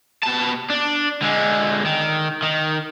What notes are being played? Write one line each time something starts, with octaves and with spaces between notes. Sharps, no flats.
B2 A5
D4
D3 G#3
D#3
D#3